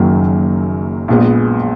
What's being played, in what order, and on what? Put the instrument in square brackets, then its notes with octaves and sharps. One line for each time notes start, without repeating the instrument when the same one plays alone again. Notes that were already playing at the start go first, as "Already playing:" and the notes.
Already playing: [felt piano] F#1 F#2 D#3 F#3 A#3
A#1 A#2 G#3 B3